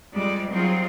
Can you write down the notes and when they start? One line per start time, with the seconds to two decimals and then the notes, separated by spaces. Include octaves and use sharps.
0.14 F2 G3 G#3 D5
0.51 F#3 G3 C4 D#4 F4 G#4